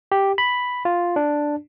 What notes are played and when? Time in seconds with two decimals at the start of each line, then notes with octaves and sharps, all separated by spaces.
0.12 G4
0.38 B5
0.85 F4
1.16 D4